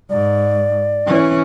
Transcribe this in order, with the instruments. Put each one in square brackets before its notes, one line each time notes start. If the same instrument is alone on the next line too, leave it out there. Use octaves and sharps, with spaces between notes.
[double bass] G#2 [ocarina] D5
[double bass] E3 C#4